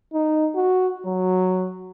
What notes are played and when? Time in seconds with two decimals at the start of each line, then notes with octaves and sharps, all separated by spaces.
0.13 D#4
0.55 F#4
1.06 F#3